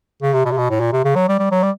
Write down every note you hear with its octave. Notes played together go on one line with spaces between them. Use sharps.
C#3
C3
B2
C3
B2
A2
A#2
C3
C#3
F#3
G3
G3
F#3
G3